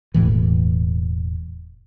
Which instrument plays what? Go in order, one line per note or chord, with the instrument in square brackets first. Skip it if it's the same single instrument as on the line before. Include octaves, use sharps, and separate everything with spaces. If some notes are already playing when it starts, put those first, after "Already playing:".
[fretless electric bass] E1 C#2 A2 E3